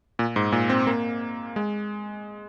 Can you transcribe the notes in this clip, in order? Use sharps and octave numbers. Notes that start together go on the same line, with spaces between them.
A#2
G#2
A#2
C4
A#3
G#3